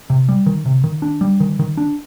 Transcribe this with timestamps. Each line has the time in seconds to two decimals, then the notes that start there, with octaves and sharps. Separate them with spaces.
0.10 C3
0.29 G3
0.46 D#3
0.66 C3
0.84 D#3
1.02 D4
1.21 G3
1.40 D#3
1.59 D#3
1.77 D4